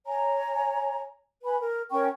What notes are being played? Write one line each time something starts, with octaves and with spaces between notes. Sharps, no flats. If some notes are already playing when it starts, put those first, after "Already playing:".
C#5 G#5 A#5
B4 G#5 B5
A#4
C#4 A#4 G5 C#6